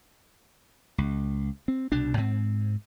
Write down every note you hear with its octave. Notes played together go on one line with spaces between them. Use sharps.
C#2
C4
C2 B2 D4
G#2 C4